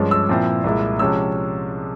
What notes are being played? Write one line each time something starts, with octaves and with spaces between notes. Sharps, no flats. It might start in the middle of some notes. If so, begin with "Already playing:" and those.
Already playing: G2 F3 G#3 C#4
E6
A#2 F3 C4 E4
C2 A#2 G#3 E4
C3 F3 G#3 C#4 E6